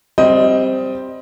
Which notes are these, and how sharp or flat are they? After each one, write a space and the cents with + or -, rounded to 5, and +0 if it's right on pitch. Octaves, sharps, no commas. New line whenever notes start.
G3 +0 C4 +0 D#5 +15